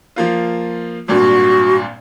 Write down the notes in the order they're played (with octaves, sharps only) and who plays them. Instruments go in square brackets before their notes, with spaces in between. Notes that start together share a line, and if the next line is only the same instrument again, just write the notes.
[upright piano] F3 A#3 F4
[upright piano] G#1 G2 A#2 [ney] F#4